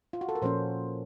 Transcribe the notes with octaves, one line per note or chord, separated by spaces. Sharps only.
F4
F#4
A4
A#4
A#2 F3 A#3 C#4 C5